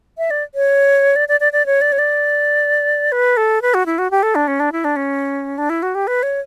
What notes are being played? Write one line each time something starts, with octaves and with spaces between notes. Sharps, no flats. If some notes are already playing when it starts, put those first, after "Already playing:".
E5
D5
C#5
D5
D5
D5
D5
C#5
D5
C#5
D5
B4
A4
B4
F#4
E4
F#4
G4
A4
D4
C#4
D4
E4
D4
C#4
D4
E4
F#4
G4
B4
C#5